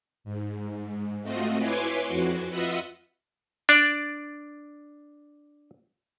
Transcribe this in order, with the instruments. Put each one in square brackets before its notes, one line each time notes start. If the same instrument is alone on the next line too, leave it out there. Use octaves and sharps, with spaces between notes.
[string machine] G#2
A3 C4 F4 F#4 D#5
E4 B4 C#5 G#5 C6 D6
F2 F#4
F4 B4 D#5 E5 F#5 E6
[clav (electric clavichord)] D4 D5